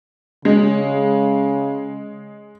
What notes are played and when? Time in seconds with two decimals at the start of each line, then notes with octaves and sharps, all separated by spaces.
0.45 C#3 G#3